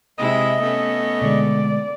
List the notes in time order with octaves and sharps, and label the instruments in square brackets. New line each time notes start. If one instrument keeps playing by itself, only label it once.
[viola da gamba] C3 G#3 E4 [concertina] D#5 [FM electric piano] D#6
[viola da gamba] A3 B3 C#4
[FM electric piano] B2 D3 G#3 [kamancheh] D5